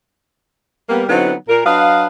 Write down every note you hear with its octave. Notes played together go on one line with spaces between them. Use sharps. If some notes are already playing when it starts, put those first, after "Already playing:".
G3 A#3 B3
D3 F#3 B3 C4 D#4 E4
A#2 A#4
F#3 D4 B4 D#5 F5